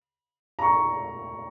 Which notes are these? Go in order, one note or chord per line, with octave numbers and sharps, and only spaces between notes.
A#5
C#6